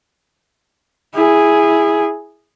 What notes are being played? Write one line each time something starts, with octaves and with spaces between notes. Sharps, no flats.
E4 G#4